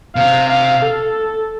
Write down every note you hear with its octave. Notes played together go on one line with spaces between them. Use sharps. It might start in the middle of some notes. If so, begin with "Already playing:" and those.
C3 F5
F5
A4